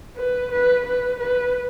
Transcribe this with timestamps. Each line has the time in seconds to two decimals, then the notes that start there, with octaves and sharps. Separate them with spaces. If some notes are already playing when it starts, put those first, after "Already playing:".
0.17 B4
0.52 B4
0.87 B4
1.20 B4